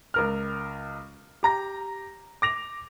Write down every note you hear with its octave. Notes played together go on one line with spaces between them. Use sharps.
C#2 A#4 F6
G4 A#5 A#6
D6 A#6 F7